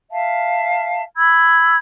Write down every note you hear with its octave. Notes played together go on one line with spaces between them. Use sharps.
E5 F5 A5
B5 E6 G#6